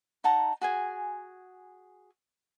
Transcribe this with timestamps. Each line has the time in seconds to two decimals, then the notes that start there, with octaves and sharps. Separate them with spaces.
0.24 D#4 F#5 A5 A#5
0.61 F#4 G#4 G#5